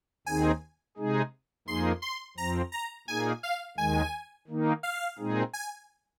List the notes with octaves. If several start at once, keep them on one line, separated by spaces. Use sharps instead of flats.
D#2 D#3 C4 D#4 G#4 G#5
C3 G#3 D#4 G#4
F2 F3 A#3 D#4 G#4 C6
C6
F2 F3 C4 A#5
A#5
A#2 A#3 D#4 G#4 G#5
F5
D#2 D#3 G#3 G#5
D#3 A#3 D#4
F5
A#2 G#3 C4 D#4 G#4
G#5